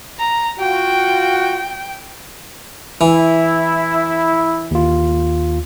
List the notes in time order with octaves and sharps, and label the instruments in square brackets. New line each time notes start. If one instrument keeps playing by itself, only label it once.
[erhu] A#5
[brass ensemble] F4 F#4 [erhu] G5
[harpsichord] E3 [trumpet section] E4
[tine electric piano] D#2 F4